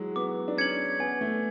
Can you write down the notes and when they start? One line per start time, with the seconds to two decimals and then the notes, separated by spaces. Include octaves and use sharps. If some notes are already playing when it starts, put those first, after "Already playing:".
Already playing: E3 F#3 G#3
0.16 B3 D6
0.48 D4
0.58 C#4 G#6 C#7 F#7
1.00 B3 G#5
1.21 A3